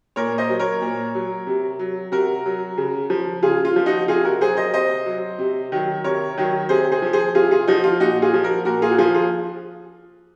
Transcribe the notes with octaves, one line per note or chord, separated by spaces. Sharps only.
A#2 A#4 C#5
C5 D#5
F#3
A#4 C#5
A#2
F#3
C3
F#3
C3 F#4 A#4
F#3
C#3
F3
C#3 F4 G#4
F4
F3
D#4 F#4
C3 F4 G#4
F#4 A#4
F#3 G#4 C5
C5 D#5
C3 C5 D#5
F#3
C3
D#3 F#3
C3 A#4 C#5
D#3 F#3
C3 G#4 C5
G#4 C5
F3
G#4 C5
C3 F4 G#4
F4 G#4
F3 D#4 F#4
F4
A#2 D#4 F#4
F4 G#4
F3
F#4 A#4
A#2 F#4 A#4
F4 G#4
F#4
F3 F4 G#4
F4 G#4